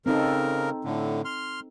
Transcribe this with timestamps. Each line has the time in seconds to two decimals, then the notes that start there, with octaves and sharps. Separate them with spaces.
0.06 C#3 C4 D#4 A4 A#4
0.85 A2 D3
1.25 C6 F6